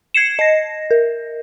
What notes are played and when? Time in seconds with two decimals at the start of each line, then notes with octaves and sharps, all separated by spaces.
0.14 G#6 C7 C#7 E7
0.39 D#5 A#6
0.91 A#4